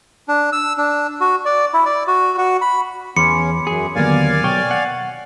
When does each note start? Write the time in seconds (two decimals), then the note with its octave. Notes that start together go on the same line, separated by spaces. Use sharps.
0.28 D4
0.52 E6
0.78 D4
1.20 F#4
1.45 D5
1.74 E4
1.85 D5
2.07 F#4
2.38 F#4
2.61 B5
3.17 E2 C#4 B5 C6 D6 C#7
3.67 F#2 G#4
3.96 D#2 D3 F#3 A#3 B3 D5 F5 G#5
4.44 B1 C#5 G5 C#6
4.71 F#5